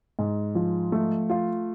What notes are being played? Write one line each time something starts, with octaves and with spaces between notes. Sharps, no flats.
G#2
F3
A3
F4